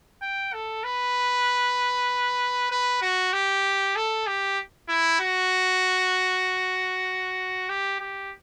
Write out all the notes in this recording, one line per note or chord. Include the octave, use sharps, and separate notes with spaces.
G5
A4
B4
B4
F#4
G4
A4
G4
E4
F#4
G4
G4